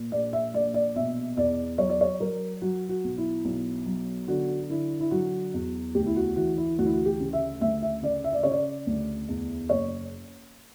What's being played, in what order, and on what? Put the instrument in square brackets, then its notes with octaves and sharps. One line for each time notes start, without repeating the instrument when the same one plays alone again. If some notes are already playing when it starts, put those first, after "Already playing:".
Already playing: [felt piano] A#2
A#1 D5
E5
A#1 D5
D5
B2 E5
E2 D5
F#3 C#5
D5
C#5
F#3 A#4
F#3 F#4
F#4
B1
E4
B1
F#3
D3 F#4
D3 E4
E4
F#3 F#4
E2
D2 G4
E4
F#4
E3 F#4
E4
D2 F#4
E4
F#4
G4
C#3
E5
D2 E5
E5
C#3 D5
E5
D5
C#3 C#5
D5
D2
E2
F#1 C#5